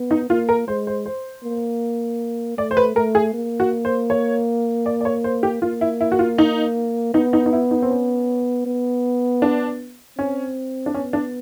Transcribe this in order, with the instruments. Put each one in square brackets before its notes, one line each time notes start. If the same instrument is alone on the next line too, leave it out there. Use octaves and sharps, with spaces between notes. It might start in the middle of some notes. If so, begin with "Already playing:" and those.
Already playing: [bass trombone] B3
[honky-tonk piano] D#4
[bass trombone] A#3 [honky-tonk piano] F4
[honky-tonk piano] A#4
[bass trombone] G#3 [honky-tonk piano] C5
[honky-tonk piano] C5
C5
[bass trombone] A#3
[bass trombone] A3 [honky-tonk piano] D5
[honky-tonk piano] C5
B4
[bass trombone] A3 [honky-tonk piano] A#4
[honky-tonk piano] G#4
[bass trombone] A#3
[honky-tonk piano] F#4
C5
C#5
D5
D5
C#5
C5
G4
[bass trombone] A#3 [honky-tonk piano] F4
[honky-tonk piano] E4
E4
F#4
F4
D#4
[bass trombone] B3 [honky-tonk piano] D#4
[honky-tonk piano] D#4
D#4
E4
D#4
C4
C#4
[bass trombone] B3
[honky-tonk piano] D4
[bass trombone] C4 [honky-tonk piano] C#4
[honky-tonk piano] D4
[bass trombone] B3 [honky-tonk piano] C#4
[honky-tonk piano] D4